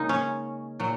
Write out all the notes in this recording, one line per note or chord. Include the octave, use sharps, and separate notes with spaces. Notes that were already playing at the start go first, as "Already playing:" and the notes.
Already playing: C#3 G#3 A#3 D#4
C#4
A#2 F#3